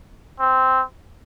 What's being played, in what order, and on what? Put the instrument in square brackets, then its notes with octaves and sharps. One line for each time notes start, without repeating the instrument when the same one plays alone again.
[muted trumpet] C4